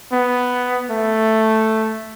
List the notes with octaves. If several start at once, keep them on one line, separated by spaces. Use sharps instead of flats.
B3
A3